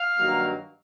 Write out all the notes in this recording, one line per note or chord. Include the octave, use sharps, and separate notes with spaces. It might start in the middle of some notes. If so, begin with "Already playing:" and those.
Already playing: F5
G2 D#3 F#3 A#3